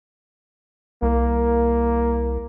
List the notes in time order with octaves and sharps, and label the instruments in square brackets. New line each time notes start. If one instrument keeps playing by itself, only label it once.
[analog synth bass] C2 [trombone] A#3